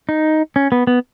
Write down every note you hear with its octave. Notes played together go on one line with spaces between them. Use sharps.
D#4
C#4
B3
B3